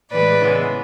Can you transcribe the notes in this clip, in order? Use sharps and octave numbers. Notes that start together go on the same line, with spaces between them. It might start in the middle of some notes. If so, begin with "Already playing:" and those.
A2 E3 G#3 B4 D5
C#3 E3 G#3 B3